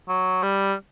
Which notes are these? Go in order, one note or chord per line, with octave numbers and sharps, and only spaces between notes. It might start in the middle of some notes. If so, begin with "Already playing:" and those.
F#3
G3